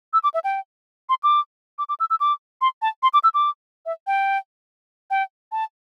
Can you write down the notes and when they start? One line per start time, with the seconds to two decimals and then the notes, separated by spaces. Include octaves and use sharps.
0.13 E6
0.24 D6
0.34 E5
0.44 G5
1.09 C6
1.23 D6
1.79 D6
1.89 D6
2.00 E6
2.10 E6
2.20 D6
2.61 C6
2.82 A5
3.03 C6
3.14 D6
3.24 E6
3.34 D6
3.86 E5
4.07 G5
5.10 G5
5.52 A5